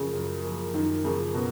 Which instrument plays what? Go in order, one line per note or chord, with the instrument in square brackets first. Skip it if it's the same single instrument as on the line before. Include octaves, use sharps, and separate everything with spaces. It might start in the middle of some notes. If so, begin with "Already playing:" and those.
Already playing: [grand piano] F#2 F3 A#3 [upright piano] C#3
[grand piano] F#2
F3 A#3
[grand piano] F#2 [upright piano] D#3
[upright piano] C#3 [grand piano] F3 A#3
[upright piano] B2